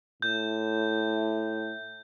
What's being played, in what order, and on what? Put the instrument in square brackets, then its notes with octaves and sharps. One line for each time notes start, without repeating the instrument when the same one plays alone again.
[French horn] A2 [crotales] G6